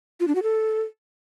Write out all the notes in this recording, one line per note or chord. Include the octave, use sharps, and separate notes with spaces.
F4
D4
F#4
A4